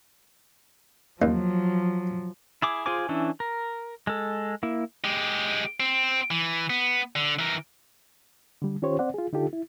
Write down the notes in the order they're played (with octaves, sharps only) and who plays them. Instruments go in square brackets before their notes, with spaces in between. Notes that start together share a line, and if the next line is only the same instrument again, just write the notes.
[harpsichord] D#2 [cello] F3 F#3
[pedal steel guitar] E4 G#4 D6
F4 G#4 C5 G#5 D6
E3 C#4 D4 E4
A#4
G#3 A4
A#3 E4
[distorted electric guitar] G#3 G4
C4
E3
B3
D3
E3 A#4
[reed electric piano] D3 G3
D#3 C#4 F4 G4 C5 C#5
C4 C5 D5 F#5
F4 G#4
D3 D#4 F4 G4 A4
E4